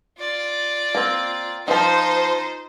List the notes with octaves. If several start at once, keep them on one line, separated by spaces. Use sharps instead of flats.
F4 D5
A#3 C4
D#3 F3 D#4 F4 C5